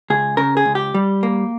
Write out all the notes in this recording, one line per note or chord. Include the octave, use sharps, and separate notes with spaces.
C#2 G#4
C#3 A#4
G#4
C#2
G4
G3
A#3